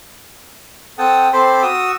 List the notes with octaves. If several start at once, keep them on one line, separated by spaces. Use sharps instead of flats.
C4 A4 F#5 G5 A5 D#6
C4 A4 C5 B5 C6 D6
F#4 D#6 E6